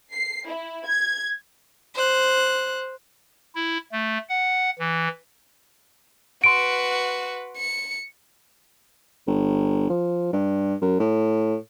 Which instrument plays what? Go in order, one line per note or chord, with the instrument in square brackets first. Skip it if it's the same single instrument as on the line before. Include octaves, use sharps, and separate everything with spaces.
[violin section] C7
E4
G#6
[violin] C5 F#6
[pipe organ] E4
A3
F#5
E3
[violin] F#4 B4 [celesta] C6 D7
[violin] C#7
[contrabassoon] G1
F3
G2
F#2
A2